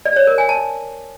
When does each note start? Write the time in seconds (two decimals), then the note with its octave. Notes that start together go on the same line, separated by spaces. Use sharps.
0.05 D5
0.16 C#5
0.27 A#4
0.38 G#5
0.49 A5